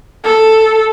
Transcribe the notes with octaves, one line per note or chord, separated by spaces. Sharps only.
A4